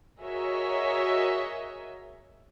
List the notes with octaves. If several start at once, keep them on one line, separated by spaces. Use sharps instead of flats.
F#4 G#4 A#4 C#5 D#5 E5